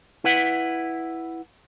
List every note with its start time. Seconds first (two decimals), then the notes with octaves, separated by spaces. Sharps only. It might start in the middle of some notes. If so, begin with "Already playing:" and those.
0.24 E4 B4 F#5